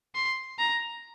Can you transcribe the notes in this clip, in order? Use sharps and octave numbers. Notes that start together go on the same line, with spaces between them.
C6
A#5